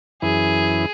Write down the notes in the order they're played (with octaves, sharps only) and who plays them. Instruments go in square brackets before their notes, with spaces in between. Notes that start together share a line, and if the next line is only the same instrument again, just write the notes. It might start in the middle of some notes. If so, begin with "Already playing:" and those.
[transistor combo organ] F#2 E3 E4 [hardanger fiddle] G#4